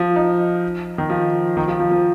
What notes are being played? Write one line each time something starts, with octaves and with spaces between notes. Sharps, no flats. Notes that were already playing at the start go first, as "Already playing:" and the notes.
Already playing: F3
D#4
D#3
F3
D#3
F3
F3
F3